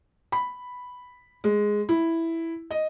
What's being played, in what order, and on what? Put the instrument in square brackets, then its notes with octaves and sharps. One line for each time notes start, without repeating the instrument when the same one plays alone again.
[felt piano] B5
G#3
E4
D#5